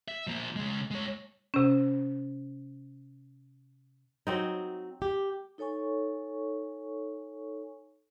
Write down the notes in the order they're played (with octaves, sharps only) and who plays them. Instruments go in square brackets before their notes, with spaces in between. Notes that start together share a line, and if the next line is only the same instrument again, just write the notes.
[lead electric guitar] E5
F3 A#3
C#3 G#3
G#3 C#5
[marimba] C3 C#4
[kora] F#3 C4 D#4
[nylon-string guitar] G4
[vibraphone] D#4 A4 C#5 G#5 C#6